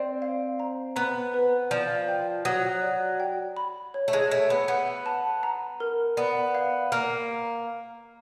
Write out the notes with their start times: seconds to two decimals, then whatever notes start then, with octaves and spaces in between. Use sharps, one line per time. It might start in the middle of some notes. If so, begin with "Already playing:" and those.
Already playing: C4 D5
0.22 F5
0.60 A#5
0.96 B3 A#5
1.34 B4
1.71 F3 D5
2.08 G5
2.45 F#3 D#6
2.82 D5
3.20 G5
3.57 B5
3.94 C#5
4.08 A3
4.13 G#3
4.31 A3 C#5
4.50 B3
4.68 B3 F#5
5.06 A5
5.43 A#5
5.80 A#4
6.17 B3 D5
6.55 F5
6.92 A#3 F6